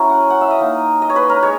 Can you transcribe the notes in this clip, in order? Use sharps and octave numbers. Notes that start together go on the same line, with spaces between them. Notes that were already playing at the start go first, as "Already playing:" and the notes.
Already playing: F#3 C#4 E4 A#4 C#5
F#5
G#5
F#5
E5
D#5
A#3 D#4
D#5
C#5
B4
A#4
G#3 C#5